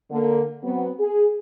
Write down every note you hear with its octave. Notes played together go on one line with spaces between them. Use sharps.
D3 A#3
F#3 B3 C4
G#4